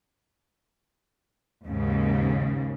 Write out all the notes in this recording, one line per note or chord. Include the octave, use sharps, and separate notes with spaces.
D#2 G#2 C#3